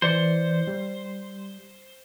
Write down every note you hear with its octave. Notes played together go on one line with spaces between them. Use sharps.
E3 C5 D5 C#7
G3